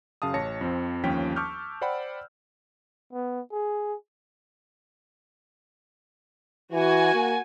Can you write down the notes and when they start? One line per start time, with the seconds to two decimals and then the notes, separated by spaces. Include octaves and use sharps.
0.22 F#2 C#3 F5 A5 D#6
0.34 A1 C#5 A5 A#6 C#7
0.61 F2 F3 C4
1.04 G1 D#2 F3 C#4 G5 B6
1.36 A5 C#6 D6 E6 F6 G6
1.81 C5 D5 F#5 G5 B5
3.13 B3
3.52 G#4
6.73 E3 F#4 G#5
7.14 A#3